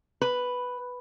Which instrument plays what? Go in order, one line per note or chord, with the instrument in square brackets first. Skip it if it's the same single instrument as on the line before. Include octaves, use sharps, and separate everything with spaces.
[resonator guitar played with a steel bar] B4